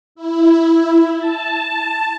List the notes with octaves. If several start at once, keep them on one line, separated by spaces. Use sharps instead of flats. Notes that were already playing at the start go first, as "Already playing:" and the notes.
E4
A5